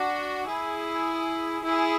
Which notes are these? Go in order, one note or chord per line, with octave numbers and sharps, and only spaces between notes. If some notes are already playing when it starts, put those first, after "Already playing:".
Already playing: D4 F#4
E4 G#4
E4 G#4